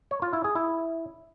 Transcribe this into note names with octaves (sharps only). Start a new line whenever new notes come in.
C#5
F4
E4
G#4
E4